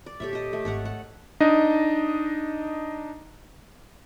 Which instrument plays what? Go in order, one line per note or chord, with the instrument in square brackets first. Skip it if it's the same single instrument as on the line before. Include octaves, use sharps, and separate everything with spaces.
[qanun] D5
[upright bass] A#2 D#3 [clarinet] G4 [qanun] A4 C#5 E5
[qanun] A4 D#5
A3
[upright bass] G#1 [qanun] A4 C#5 F#5
[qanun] F#5
[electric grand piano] D4 D#4 D#5